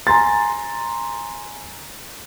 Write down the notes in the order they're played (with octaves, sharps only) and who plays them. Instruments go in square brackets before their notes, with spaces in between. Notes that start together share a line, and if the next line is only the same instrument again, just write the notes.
[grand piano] G#5 A#5 C6 A6